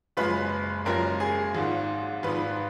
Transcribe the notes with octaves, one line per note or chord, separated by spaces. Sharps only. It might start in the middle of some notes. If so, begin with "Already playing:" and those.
F#1 F#2 F3 G#3 B4
F#1 F#2 F3 G#3 A#4
G#4
G#1 G#2 F3
G#1 G#2 F3 B4